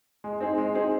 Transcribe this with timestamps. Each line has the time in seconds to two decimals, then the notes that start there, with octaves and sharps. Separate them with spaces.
0.24 G#3
0.40 C4 D#4 G#4
0.58 G#3
0.75 C4 D#4 G#4